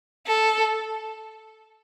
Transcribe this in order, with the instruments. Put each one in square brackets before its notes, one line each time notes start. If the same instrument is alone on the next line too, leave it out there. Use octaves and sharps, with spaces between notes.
[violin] A4